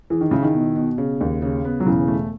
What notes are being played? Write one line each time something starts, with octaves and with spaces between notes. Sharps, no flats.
E3 G#4
D#3
C#3 E4
D#3
B2
B2
C#3
D#2
C#3
B3
F#3
E1 C#3 E3
A3